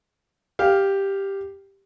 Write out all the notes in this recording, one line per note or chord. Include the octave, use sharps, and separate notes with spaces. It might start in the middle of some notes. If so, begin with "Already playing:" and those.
G4 F5